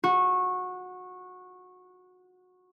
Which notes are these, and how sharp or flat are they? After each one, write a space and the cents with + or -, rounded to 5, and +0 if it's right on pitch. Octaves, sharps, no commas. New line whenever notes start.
F#4 -20